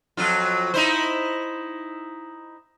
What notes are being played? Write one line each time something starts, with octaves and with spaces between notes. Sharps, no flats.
F2 F#3 F4
D#4 E4 C5